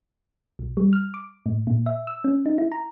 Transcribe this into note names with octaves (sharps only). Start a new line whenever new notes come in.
B1
G3
F6
D6
A2
A#2
E5
E6
C#4
D#4
E4
A#5